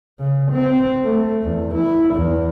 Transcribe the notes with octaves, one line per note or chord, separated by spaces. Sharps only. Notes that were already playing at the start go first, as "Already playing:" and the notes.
C#3
C4
A3
E2
E4
E2